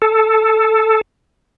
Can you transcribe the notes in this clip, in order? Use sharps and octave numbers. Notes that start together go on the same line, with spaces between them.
A4